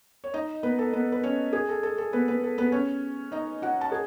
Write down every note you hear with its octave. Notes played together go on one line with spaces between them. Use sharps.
C#5
D#4 D#5
B3 B4
A4
B3 B4
B4
C#4 C#5
G#4
A4
A4
A4
B3 B4
B3 B4
A4
B3 B4
C#4 C#5
D#4 D#5
F#4 F#5
A5
G#4